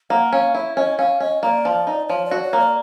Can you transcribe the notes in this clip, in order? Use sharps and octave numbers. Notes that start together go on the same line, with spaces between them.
A#3 F#5
C#4 F5
E4 E5
C#4 D#5
C#4 F5
C#4 D#5
A#3 D5
F3
D#4
F3 C#5
D5
F#4
C#5
A#3
D5